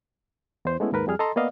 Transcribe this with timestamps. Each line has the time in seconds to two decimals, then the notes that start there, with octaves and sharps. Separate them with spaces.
0.65 E2 C5
0.80 G#3 A3 B3 C#4 E4
0.92 D#2 G#2 A#4 B4
1.07 F2 G3 G#4 F6
1.19 A4 D#5 A5 A#5 C6
1.36 A#3 B3 D5 D#5 F5